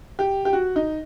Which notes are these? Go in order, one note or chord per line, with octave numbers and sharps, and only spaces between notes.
G4
G4
F#4
D#4